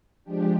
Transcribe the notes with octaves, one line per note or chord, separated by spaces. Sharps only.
F3 G#3 D4 G4